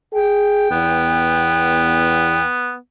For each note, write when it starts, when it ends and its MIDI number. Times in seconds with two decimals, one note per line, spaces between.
0.13 0.70 68
0.13 2.41 79
0.71 2.42 40
0.71 2.76 59